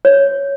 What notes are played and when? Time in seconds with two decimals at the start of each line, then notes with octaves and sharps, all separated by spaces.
0.05 C#5